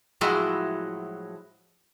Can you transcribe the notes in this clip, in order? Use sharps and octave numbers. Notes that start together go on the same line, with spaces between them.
A2 F3 F#3 G#3 E4 F#4